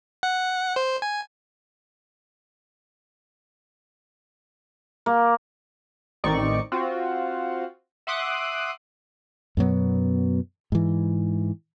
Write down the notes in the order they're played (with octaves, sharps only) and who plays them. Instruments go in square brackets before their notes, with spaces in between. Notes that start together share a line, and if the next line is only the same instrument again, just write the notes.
[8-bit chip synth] F#5
C5
G#5
[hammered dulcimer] A#3
[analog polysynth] A1 D#3 C4 D#4 D5 C#6
C4 F4 F#4
E5 F#5 C6 D6 D#6 F#6
[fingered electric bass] F#2 B2 F#3 B3
G#2 E3